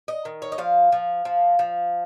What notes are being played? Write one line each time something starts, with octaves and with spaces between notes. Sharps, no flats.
D#5
D#3
C#5
D#5
F3 F5
F3
F3
F3